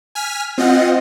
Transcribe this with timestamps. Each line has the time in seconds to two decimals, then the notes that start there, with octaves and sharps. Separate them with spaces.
0.15 G#5 F6 B6
0.58 C4 F4 D#5 F#5